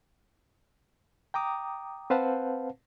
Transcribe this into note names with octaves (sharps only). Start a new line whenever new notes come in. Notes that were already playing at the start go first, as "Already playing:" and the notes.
G5 A#5 D6 D#6
C4 B4 C5 F5 F#5 A5